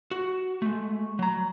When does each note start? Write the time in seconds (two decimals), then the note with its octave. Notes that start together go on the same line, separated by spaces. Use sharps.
0.11 F#4
0.62 G#3 A3
1.19 F#3 A#5